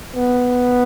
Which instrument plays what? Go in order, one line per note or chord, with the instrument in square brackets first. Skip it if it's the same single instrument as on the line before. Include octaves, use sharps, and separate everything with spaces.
[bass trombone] B3